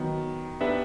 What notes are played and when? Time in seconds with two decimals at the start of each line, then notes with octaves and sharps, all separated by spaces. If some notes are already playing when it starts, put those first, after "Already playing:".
Already playing: D#3 F#3 B3
0.60 B3 D4 G4 B4 E5